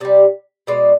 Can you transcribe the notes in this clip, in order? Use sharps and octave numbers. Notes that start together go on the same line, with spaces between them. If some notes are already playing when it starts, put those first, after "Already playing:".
C3 G3 D5
B2 G#3 D5